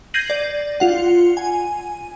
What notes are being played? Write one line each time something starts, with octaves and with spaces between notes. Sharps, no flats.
G6 G#6 A#6 C7 D#7 F#7
D5
F4 F#5
G#5